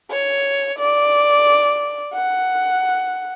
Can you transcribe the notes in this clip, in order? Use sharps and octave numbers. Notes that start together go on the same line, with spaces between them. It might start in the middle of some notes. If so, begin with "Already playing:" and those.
C#5
D5
F#5